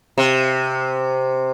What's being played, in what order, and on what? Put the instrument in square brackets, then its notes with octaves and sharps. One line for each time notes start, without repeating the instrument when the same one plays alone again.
[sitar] C3